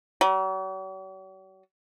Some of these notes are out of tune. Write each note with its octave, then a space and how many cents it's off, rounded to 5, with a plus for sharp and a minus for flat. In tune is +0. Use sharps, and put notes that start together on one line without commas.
F#3 +45